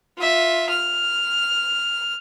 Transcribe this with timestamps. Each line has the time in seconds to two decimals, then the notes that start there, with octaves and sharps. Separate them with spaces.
0.17 F4 E5
0.70 F6